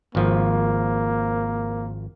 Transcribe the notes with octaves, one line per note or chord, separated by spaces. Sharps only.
G#1 F3 A#3